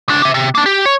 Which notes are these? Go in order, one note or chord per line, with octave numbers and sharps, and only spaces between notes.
C#2 D4
G4 E5
C3
A#3 D4
G4
C#5